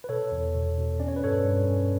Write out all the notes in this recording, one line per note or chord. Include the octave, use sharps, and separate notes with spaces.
B4
B2 A4 C#5
E2
B2
B2
C#4 D5
C#5
B4
G2 A4 C#5
G2
C#4